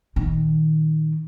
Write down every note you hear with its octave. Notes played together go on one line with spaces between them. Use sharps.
A#2 D#3